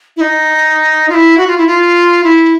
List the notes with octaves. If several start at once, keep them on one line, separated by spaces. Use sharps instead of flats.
E4
D#4
F4
E4
F#4
F4
E4
F4
E4